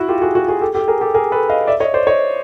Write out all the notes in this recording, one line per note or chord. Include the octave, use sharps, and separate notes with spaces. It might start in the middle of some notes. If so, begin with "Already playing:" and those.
Already playing: E4 F#4
F4 G4
F#4 G#4
F#4 G#4
F#4 G#4
G4 A4
G4 A4
G#4 A#4
G4 A4
G#4 A#4
A4 B4
D#5 F5
D5 E5
C#5 D#5
C5 D5
C#5 D#5